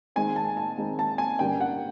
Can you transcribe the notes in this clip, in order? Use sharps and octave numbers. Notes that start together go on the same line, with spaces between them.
D#3 G#3 C4 D#4 G#5
A5
A5
D#3 G#3 C4 D#4
A5
G#5
G2 D3 G3 A#3 C#4 G5
F#5